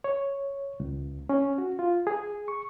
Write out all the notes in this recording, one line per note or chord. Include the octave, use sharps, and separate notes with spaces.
C#5
C#2
C#4
F#4
F4
G#4
C#6